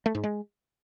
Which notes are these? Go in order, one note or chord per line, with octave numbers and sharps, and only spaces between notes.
A3
G#2
G#3